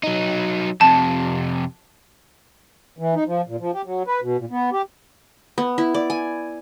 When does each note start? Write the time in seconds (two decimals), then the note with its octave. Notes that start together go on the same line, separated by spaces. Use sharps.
0.03 F#3 D#4
0.81 F2 C3 A5
2.98 E3
3.15 D#4
3.26 F3
3.47 A#2
3.59 F3
3.73 G4
3.85 F#3
4.07 B4
4.22 B2
4.37 A#2
4.50 B3
4.72 G4
5.58 B3
5.78 E4
5.94 D5
6.10 G#5